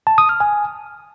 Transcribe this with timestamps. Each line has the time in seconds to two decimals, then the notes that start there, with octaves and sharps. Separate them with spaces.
0.07 A5
0.18 D#6
0.29 F6
0.40 G#5